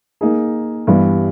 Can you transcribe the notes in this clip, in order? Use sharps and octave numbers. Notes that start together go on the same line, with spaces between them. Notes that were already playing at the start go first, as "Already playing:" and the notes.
A#3 D#4 G#4
G2 E3 G3 B3 E4